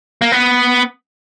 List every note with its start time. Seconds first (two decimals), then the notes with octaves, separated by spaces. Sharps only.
0.22 A#3
0.32 B3